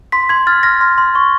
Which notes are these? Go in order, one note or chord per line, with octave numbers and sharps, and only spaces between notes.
C6 B6
C6 G#6
F6 A6
F6 A#6
C6
C6
C#6